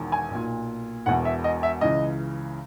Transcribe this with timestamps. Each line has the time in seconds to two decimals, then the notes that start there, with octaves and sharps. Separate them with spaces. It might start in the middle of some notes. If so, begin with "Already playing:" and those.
Already playing: E1 E2 D#3
0.12 G#5
0.31 B1 A#2
1.06 E1 E2 B2 F#5
1.25 E5
1.44 D#5
1.63 E5
1.81 C#2 C#3 E3 D#5